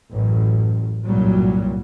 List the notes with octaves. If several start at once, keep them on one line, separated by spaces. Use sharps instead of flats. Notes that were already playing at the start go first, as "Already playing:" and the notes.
A1 F#2
C2 G2 A#2 F#3 G3